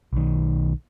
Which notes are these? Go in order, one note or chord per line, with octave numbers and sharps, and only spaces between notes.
B1 D#3